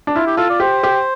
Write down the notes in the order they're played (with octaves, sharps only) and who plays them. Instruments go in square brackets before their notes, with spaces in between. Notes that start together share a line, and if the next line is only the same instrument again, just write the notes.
[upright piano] D4
[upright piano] E4 [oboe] F4
[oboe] G4
[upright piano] F4 [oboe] A4
[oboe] D5
[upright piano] G4 [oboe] C5
[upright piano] G4